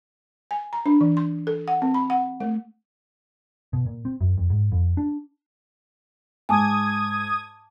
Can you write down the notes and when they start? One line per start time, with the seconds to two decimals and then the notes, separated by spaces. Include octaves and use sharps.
0.51 G#5
0.73 A#5
0.86 D4
1.01 E3
1.17 C6
1.47 A4
1.68 F#5
1.82 C4
1.94 B5
2.10 F#5
2.40 A3
3.73 B2
3.86 A#2
4.05 C4
4.21 F#2
4.37 F2
4.50 G#2
4.72 F2
4.97 D4
6.49 G#2 G#5 A5 D6 D#6 G#6